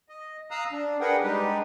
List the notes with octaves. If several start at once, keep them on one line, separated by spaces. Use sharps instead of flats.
D#5
F5 A#5 D#6 E6 F#6
D4
D4 G#4 A#4 B4 F#5 G5
G3 G#3 D4 D#4 G4 B4